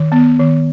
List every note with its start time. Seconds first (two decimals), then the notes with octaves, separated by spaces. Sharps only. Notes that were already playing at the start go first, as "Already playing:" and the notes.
Already playing: D#3
0.12 B3
0.39 D#3